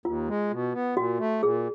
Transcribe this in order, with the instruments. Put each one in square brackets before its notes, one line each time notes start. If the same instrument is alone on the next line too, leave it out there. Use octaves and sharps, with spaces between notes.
[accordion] D#2 [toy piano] F4
[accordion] G#3
B2
B3
[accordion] A#2 [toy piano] F#4
[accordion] A3
[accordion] A#2 [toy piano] G#4